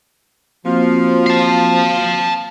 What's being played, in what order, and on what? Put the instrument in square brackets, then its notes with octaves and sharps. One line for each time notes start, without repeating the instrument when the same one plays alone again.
[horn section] F3 [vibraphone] A#3 C4 F#4
[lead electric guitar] F5 A5